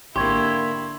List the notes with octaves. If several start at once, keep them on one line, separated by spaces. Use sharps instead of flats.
G#1 D3 A#3 E4 G4 C6 C#6 G#6